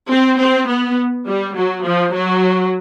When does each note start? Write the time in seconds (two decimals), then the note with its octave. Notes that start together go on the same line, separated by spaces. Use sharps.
0.11 C4
0.39 C4
0.69 B3
1.27 G3
1.56 F#3
1.85 F3
2.14 F#3